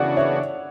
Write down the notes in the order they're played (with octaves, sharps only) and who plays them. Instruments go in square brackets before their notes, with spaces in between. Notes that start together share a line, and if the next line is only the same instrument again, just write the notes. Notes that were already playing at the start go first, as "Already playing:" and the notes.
Already playing: [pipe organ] C#3 E3 B3 D4 F#4 [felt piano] D5 F#5
[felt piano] C#5 E5